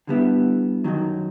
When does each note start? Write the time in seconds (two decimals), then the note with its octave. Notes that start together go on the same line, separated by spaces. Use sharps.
0.07 D3 G3 B3 E4
0.84 F#2 D#3 F#3